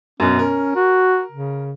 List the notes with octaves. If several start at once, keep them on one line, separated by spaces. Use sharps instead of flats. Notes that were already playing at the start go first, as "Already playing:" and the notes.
F#2 B2 C#4
C#4 A#4
F#4
C#3